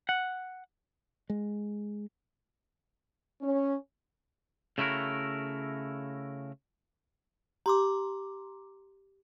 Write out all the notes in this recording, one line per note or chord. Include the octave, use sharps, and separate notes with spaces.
F#5
G#3
C#4
C#3 A3 E4 F#4 A#4
G4 A#5 C6 D6